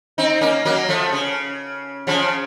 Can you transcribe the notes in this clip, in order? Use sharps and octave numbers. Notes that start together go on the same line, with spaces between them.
C4 D#4
A#3 C#4
F#3 A#3
F3 A3
C#3
C#3 F3